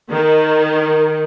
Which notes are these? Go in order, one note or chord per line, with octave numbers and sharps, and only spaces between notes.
D#3